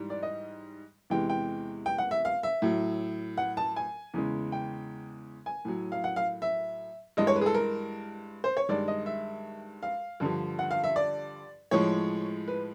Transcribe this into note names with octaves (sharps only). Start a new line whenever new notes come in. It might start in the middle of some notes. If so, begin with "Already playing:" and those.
Already playing: G#2 E3 G3
D5
D#5
E2 C3 E3 G#3 G5
G5
G5
F#5
E5
F5
E5
A2 F#3
F#5
A5
G#5
E2 C#3 E3 G#3
G5
G#5
A2 F#3
F5
F#5
F5
E5
G2 E3 G#3 D#5
C#5
B4
G#4
A4
A#4
C5
C#5
G2 D#3 G#3 D5
D#5
E5
F5
G2 D3 F3
F#5
F5
E5
D5
A2 F3 G#3 C#5
B4